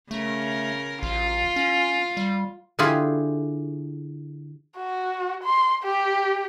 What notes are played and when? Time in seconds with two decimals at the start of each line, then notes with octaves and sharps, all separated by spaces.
0.11 C#3 A3 A#4
1.03 A1 F4
1.56 C#4
2.17 G3
2.79 D3 E4 F4 G4 G#4
4.77 F#4
5.44 C6
5.83 G4